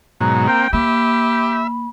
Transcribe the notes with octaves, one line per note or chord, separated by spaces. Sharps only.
G#2 B2 F#3 A#5
A#3 C4 G5
A#3 G4 E5 B5